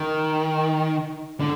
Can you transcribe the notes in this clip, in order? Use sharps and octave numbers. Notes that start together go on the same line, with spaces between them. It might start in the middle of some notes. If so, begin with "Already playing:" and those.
Already playing: D#3
D3